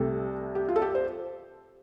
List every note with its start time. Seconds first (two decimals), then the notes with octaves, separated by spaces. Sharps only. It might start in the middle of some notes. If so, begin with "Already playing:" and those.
Already playing: C2 C3 A3 A4
0.55 G4
0.68 F4
0.76 A4
0.82 G4
0.95 C5